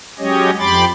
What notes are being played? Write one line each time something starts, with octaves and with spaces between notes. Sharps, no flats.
F#3 G#3 C#4 G4 C#5 D#5
F2 G4 B5 C6 D6 A6